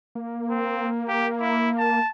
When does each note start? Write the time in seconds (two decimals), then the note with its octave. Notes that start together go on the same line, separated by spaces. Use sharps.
0.15 A#3
0.50 C4
1.08 G4
1.40 E4
1.78 A5